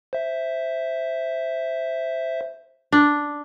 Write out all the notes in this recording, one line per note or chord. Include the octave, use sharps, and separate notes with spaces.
C5 E5
D4